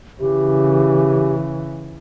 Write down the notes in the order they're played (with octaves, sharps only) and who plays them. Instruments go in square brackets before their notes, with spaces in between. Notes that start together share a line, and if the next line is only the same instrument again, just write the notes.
[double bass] C#3 E3 [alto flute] G4